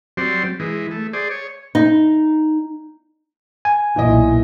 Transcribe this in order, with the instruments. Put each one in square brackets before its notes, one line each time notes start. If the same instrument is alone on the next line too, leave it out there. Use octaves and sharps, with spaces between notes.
[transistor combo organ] F#3 G3 C4 C5 D5
E3 G#3
A3
G#4 C5 D5
C#5
[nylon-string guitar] D#4
[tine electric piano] G#5
[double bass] B1 A#2 [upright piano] E3 E4 D#5